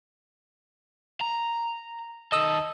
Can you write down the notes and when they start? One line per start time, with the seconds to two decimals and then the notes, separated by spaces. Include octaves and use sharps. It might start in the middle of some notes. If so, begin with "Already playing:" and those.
1.21 A#5
2.32 D#3 A4 D#5 D#6 E6